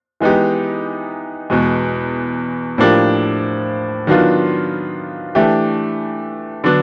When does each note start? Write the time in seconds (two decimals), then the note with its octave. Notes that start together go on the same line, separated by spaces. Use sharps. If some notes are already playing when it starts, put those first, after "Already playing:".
0.20 E3 G#3 B3 D#4 G4
1.50 E2 B2 G#3
2.78 A2 F3 A#3 D4 G4
4.07 D#3 F#3 B3 D4 F4
5.35 E3 A3 D4 G4
6.64 D3 F#3 B3 D4